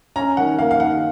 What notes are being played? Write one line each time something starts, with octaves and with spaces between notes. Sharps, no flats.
C#4 A#5
D#3 F#5
A#3 F5
F5
D#3 F#5